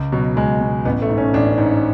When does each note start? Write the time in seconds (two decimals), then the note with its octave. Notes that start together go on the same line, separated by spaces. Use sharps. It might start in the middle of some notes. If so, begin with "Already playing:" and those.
Already playing: C#2
0.12 B2 F#3
0.36 C#2 G#3
0.61 B2
0.85 A1 B3
1.02 A3
1.09 G#2
1.18 C#4
1.34 A1 D4
1.58 G#2